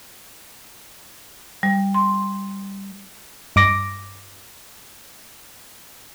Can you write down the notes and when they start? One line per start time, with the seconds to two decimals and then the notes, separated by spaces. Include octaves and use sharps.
1.63 G3
1.94 C6
3.56 G2 D6 A#6